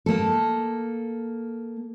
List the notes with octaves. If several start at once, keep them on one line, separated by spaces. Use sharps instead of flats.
A#3 A4